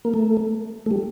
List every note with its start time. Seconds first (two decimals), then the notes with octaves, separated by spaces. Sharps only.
0.05 A#3
0.14 A3
0.86 A3
0.91 G3